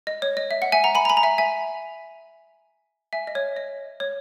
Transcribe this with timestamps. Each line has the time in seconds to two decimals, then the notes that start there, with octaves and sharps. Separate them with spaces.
0.07 D#5
0.22 C#5
0.37 D#5
0.51 E5
0.62 F#5
0.72 E5 G#5
0.84 F#5 A#5
0.95 G#5 B5
1.05 A#5
1.09 G#5 B5
1.17 A#5
1.23 E5 G#5
1.38 E5 G#5
3.13 E5 G#5
3.27 D#5
3.35 C#5
3.57 D#5
4.00 C#5